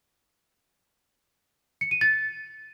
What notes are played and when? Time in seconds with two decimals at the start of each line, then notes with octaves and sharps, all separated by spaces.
1.81 C#7
1.91 D#7
2.01 A6